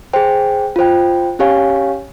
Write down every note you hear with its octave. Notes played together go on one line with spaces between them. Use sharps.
G#4 C5 G5
F4 C5 G5
C#4 G4 C#5 F5 G#5